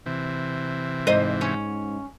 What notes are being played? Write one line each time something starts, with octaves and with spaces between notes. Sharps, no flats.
C3 E3
G#2 C5 D#5
C#4